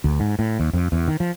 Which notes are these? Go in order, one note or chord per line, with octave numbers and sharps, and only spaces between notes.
D2
G#2
A2
D#2
F2
E2
D#3
F3